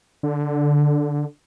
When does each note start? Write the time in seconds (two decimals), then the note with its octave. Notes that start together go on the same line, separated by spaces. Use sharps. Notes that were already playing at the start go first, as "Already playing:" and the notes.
0.23 D3